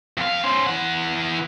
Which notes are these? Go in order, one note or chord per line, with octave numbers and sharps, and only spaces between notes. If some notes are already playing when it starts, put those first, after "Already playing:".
F2 F5
C#4 C5
E3 F#5